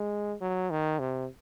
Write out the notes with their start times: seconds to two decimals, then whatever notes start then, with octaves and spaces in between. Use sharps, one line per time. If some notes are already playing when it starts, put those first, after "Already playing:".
Already playing: G#3
0.41 F#3
0.71 D#3
1.00 C3